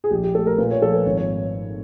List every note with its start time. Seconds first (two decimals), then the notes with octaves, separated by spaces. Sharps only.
0.04 G#4
0.11 A#1 G4
0.24 G4
0.34 A3 A4
0.47 A#4
0.58 A#2 B4
0.71 C#5
0.82 F3 A4
0.94 B4
1.06 G#1 C#5
1.17 C#5